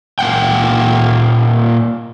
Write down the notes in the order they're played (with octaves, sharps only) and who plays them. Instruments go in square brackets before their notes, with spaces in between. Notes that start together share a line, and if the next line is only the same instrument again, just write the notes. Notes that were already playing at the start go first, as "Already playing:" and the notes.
[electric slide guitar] A#2 A#3 F#5 G5